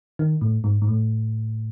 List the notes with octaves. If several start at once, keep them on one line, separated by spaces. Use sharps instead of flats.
D#3
A2
G#2
G#2
A2